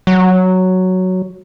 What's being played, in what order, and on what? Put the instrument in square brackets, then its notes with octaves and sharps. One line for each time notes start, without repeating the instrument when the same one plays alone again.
[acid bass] F#3